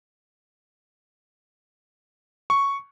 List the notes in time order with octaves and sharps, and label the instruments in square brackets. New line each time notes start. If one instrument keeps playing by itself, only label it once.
[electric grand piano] C#6